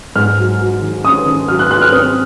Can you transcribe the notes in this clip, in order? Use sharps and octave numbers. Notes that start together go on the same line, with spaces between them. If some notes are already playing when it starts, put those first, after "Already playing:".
G#2 F6
F#3
F#3
D#3
C#4 D#6
D#3
F#3 F6
F#6
F#3 F#6
F6
C4 D#6